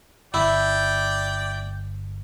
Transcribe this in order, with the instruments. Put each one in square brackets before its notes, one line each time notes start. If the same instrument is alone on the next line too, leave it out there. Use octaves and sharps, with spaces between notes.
[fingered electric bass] G1 [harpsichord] E4 [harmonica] D5 G5